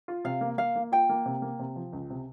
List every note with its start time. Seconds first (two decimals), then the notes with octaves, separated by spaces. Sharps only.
0.08 F4
0.25 C3 F5
0.41 A#3
0.58 A#3 F5
0.75 A#3
0.92 F4 G5
1.09 A#3
1.26 C3
1.42 A#3
1.59 C3
1.76 F3
1.93 C#2
2.10 C3